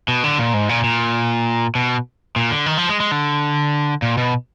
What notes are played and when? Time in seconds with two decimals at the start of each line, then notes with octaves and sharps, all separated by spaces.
0.08 B2
0.24 D3
0.39 A#2
0.54 G#2
0.69 A#2
0.84 A#2
1.75 B2
2.36 A#2
2.51 D3
2.66 D#3
2.78 F3
2.89 G#3
3.00 G#3
3.12 D3
4.02 A#2
4.17 B2